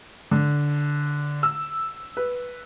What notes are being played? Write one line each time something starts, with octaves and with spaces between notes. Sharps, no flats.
D3
E6
B4